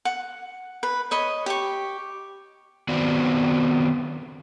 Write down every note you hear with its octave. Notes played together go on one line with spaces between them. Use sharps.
F#5
B4
C#5 D#5 B5
G4 C#6
D#3 B3 C4 F#4 D5